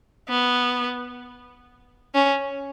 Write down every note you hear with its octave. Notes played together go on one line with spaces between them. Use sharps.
B3
C#4